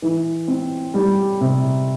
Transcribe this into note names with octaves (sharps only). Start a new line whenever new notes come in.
E3
C4
G3
C3